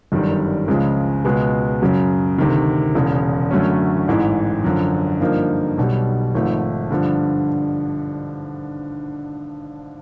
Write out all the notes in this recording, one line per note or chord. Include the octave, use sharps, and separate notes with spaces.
G1 F#2 D#3 G3
C#2 C#3 F3 G#3
C#2 B2 G#3 B3
F#2 C#3 F#3
D2 C3 D#3
E1 E2 C#3
F#2 D3 F#3 A3 C#4
A1 G#2 E3
F#2 D3 F3
G2 D3 F3 A#3 D#4
B1 B2 G3
G#1 G#2 F3 A3
G2 D3 F3